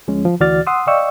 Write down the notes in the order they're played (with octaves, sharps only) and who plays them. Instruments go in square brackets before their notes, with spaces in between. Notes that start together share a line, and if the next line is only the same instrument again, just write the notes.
[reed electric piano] D2 F3 G#3 C#4
F3
D2 E3 F#4 D5 F6 A6
F#5 C6 D#6 E6
D5 D#5 F5 G5 C#6 E6